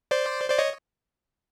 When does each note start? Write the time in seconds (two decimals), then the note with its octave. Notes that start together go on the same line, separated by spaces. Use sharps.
0.11 C5 D5
0.49 C5 D5
0.58 C#5 D#5